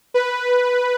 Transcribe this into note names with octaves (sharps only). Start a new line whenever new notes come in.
B4